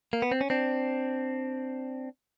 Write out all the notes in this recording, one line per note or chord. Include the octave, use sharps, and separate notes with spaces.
A#3
B3
C4
C#4
C4 D4